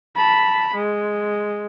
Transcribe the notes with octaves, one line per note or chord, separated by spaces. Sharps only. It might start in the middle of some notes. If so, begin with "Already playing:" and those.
A5 B5
G#3